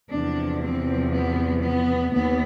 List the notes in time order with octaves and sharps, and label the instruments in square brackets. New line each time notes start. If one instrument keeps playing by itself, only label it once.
[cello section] E2 C3 F3 D4
C4
B3
B3
D#2 B3